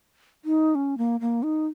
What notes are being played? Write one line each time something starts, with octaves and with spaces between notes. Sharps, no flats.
D#4
C#4
A#3
A#3
D#4